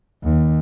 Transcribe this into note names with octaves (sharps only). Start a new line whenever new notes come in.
D#2